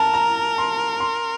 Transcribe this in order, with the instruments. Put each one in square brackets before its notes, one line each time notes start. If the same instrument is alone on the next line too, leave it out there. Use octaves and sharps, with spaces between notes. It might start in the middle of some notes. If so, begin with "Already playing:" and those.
Already playing: [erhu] A#4 [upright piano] A5
[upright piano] A#5
C6
C6